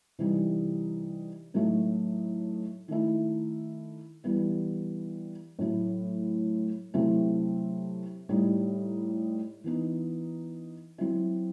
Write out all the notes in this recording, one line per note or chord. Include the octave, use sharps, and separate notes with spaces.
C3 E3 G3 D#4
A2 F#3 A3 D#4
D#3 A3 E4
E3 G3 B3 E4
A2 F#3 A3
C3 F#3 A3 C4 E4
A2 G3 D#4
E3 B3 D#4
F#3 C4 E4